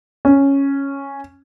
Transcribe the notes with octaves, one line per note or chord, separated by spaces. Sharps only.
C#4